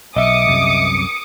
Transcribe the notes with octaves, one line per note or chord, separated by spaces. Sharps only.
B1 D#5 E5 D6 D#6 C#7
C2 F#2 C3